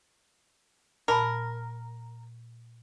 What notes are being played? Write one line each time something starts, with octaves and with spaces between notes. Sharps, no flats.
A#2 A#4 A5 B5